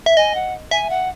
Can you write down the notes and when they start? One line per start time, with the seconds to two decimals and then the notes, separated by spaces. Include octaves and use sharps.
0.06 E5
0.17 D#5 G#5
0.35 F#5
0.71 E5 G#5
0.90 F#5